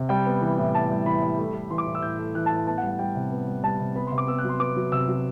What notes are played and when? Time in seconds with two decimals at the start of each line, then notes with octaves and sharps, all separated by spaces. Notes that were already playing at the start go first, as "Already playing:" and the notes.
Already playing: C3
0.09 G3 G5
0.26 B3
0.42 E3
0.58 A2
0.74 B3 A5
0.91 G3
1.06 E3 B5
1.22 G3
1.39 A3
1.54 A3
1.71 E3 C6
1.78 D6
1.86 A2
1.95 E6
2.02 A2 G6
2.19 A3
2.35 E3 F#6
2.46 A5
2.51 A2
2.56 A5
2.67 B3 A5
2.78 F#5
2.83 G3
2.88 F#5
2.99 G3 G5
3.15 C3
3.32 B3
3.48 G3
3.63 G3 A5
3.80 C3
3.95 B3 B5
4.07 C3 C6
4.18 D6
4.27 B3 E6
4.39 F#6
4.44 F#3
4.49 C6
4.60 B3 D6
4.76 F#3
4.92 C3 E6
5.08 F#3